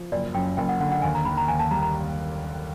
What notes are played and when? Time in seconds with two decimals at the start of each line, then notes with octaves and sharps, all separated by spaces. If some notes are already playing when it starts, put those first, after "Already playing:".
Already playing: F3
0.12 F#1 D5
0.34 F#2 G5
0.57 F#1 G5
0.69 F#5
0.80 D3 F#5
0.92 F#5
1.02 D#2 G#5
1.15 A#5
1.25 D#3 B5
1.37 A#5
1.48 D#2 G#5
1.59 A5
1.71 G3 A#5
1.82 A#5